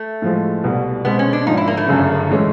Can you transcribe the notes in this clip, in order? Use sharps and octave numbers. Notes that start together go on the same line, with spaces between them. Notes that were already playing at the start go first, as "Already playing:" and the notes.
Already playing: A3
A2 F3 G#3
C2 B2 G3
B2 G#3 B3 C4
C#4
D4
G#1 G#2 F3 D#4
E4
A#3
A3
G1 F#2 C#3
A2 E3 G#3 C#4